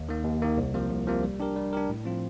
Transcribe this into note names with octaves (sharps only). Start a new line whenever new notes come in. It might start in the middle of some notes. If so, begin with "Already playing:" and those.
Already playing: D#2
D#3 A#3
D#2
D#3 A#3
C2
C3 F3 A#3
C2
C3 F3 A#3
G3
D4 G4 A#4
G3
D4 G4 A#4
A2
F3 C4 F4